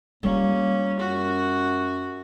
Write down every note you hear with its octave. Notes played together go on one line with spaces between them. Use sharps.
G3 A#3 C#4 F4
F#2 F#4